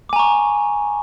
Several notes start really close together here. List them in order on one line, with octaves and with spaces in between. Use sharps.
D6 G#5 A#5 C#6